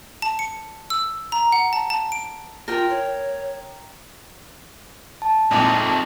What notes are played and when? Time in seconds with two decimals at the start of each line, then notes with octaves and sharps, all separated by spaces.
0.22 A5
0.39 C#7
0.90 E6
1.32 A#5
1.52 F#5
1.73 A5
1.90 A5
2.12 D7
2.68 F4 A#4 G5
2.89 C#5
5.22 A5
5.51 A#1 F2 G#2 A3 D#4